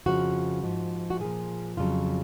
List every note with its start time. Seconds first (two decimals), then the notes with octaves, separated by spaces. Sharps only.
0.06 F2 C#3 F3 F#4
0.63 G#2 F3
1.10 F#4
1.20 A#2 F3 G#4
1.77 F2 C#3 F#3 F4